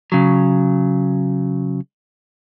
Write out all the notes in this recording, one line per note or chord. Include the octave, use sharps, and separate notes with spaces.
C#3 F#3